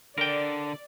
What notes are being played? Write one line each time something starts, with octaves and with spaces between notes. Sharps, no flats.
D3 A#4 D5 G5